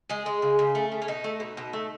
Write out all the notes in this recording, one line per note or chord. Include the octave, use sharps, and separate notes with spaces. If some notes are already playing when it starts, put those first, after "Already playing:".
G#3 G#4
G#3
C#3
C#3
A3
C#3
C#4
B2 D#4
A3
B2
B2
A3